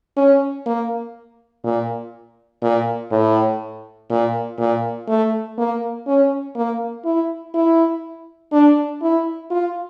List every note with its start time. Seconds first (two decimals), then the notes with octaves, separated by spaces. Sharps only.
0.17 C#4
0.66 A#3
1.64 A#2
2.63 A#2
3.12 A2
4.10 A#2
4.59 A#2
5.08 A3
5.58 A#3
6.07 C#4
6.56 A#3
7.05 E4
7.54 E4
8.52 D4
9.02 E4
9.51 F4